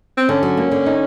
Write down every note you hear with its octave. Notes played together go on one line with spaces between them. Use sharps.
C4
D3 C#4
F#3
A#3
D3
D#4